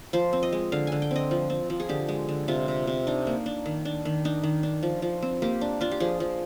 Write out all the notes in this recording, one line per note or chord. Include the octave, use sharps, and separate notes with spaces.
F3 C5
C4
D#5
G#3
D3 F5
D3 G#5
G5
C4 D#5
F3
C4
F3
G#4
D3 G4
G#3
D3
C3 F4
C3
C3
D4 D#4
A#3
D4
D#3
D4
D#3
D4 D#4
D#3
D4
F3
F3
C4
A#3 G4
D4
D4 F4
G4
F3 G#4
F3